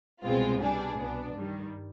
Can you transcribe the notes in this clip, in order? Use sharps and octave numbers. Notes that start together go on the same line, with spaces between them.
C2 B2 G#3 C4 F4
B2 G3 D4 G#4
C2 B2 B3 D4
G2 D#3 G3